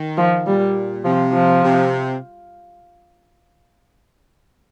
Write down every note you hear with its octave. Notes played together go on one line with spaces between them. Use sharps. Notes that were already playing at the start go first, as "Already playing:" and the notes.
Already playing: D#3
F3
A#2 G3
C3 F3
F3
C3